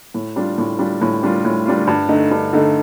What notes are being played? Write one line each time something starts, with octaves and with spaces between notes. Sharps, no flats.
A2
G3 D4 F4
A2
G3 D4 F4
A2
G3 D4 F4
A2
G3 D4 F4
G2
D3 A3 D#4
G2
D3 A3 D#4